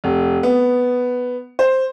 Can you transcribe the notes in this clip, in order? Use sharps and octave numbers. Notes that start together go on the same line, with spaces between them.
F1
B3
C5